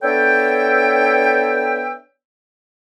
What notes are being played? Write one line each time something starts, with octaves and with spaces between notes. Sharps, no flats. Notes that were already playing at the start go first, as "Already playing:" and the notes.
B3 D4 A4 C#5 E5 G5